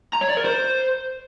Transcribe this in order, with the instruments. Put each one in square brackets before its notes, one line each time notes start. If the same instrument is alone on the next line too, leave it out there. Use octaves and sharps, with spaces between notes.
[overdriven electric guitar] A#5
C#5
D5
A#4
C5